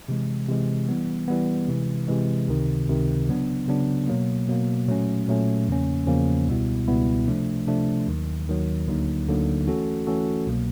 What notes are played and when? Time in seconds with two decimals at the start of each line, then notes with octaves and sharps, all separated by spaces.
0.08 C3 E3 G#3
0.48 C3 E3 G#3
0.89 E3 G3 B3
1.28 E3 G3 B3
1.68 C3 E3 G#3
2.08 C3 E3 G#3
2.48 C#2 C3 D#3
2.88 C#2 C3 D#3
3.28 C#3 F#3 B3 D4
3.68 C#3 F#3 B3 D4
4.08 B2 F#3 A#3
4.48 B2 F#3 A#3
4.87 A#2 F#3 A3 C#4
5.27 A#2 F#3 A3 C#4
5.68 E2 C#3 F3 A#3 C#4
6.07 E2 C#3 F3 A#3 C#4
6.48 C#2 B2 G3 B3 E4
6.88 C#2 B2 G3 B3 E4
7.27 C3 F3 A3 D4
7.67 C3 F3 A3 D4
8.07 D#2 D#3 F#3
8.47 D#2 D#3 F#3
8.87 D2 D3 F#3 A#3 D#4
9.27 D2 D3 F#3 A#3 D#4
9.67 E3 A3 C#4 F#4 A4
10.07 E3 A3 C#4 F#4 A4
10.47 C2 B2 F#3 A#3